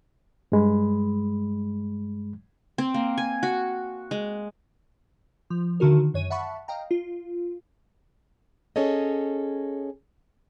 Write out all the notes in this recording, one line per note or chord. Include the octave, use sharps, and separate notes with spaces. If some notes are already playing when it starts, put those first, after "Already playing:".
G2 G#3 B5
C4
A#3
G#5
F#4
G#3
F3
D3 D#3 F#4 A#4
F#2 C#5 D#7
E5 F#5 A5 B5 C#6
D#5 F5 G5 A#5
F4
C#4 G#4 A4 C#5 D#5